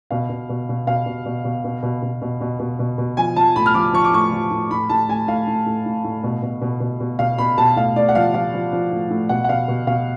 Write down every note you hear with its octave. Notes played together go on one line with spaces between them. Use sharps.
B2 F5
B2
B2
B2
B2 F5
B2
B2
B2
B2
B2
B2
B2
B2
B2
B2
B2
F3 G#5
F3 A5
A2 B5
F6
F3 D6
F3 C#6
D6
A2 C#6
F3
A2
A2 B5
A2 A5
A2 G#5
A2 F5
A2
A2
A2
A2
B2
B2
B2
B2
B2
B2 F5
B2 B5
B2 A5
A2 F5
A2 D5
F#5
F3 F5
F3 F5
F3
F3
A2
A2
B2 F#5
F#5
B2 F5
B2
B2 F5